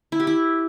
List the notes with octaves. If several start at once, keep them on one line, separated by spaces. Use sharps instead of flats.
E4
G4
E4